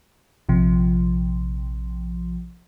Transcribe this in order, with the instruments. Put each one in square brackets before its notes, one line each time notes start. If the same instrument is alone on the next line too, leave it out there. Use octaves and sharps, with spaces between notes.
[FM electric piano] A#1 C3 F3